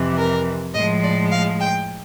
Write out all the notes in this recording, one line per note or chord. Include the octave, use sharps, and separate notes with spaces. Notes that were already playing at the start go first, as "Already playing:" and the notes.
Already playing: F2 C3 E3
A#4
A2 F3 G#3 D#5
D5
F5
G5